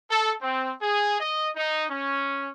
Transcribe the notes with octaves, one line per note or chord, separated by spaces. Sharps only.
A4
C4
G#4
D#5
D#4
C#4